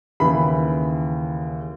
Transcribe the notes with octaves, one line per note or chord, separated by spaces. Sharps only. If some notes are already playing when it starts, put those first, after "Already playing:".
D#2 C#3 E3 B5